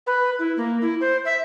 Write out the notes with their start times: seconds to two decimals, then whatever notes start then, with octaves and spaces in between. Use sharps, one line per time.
0.07 B4
0.39 E4
0.57 A#3
0.82 E4
1.01 C5
1.25 E5